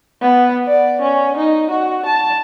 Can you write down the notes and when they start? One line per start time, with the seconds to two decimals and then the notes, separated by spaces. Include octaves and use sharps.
0.22 B3
0.67 D5
1.02 C#4
1.37 D#4
1.71 F#4
2.06 A5